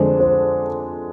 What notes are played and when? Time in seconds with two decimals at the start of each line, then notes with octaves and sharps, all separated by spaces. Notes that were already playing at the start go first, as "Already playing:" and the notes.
Already playing: F2 D3 G#3 D4 C5
0.20 C5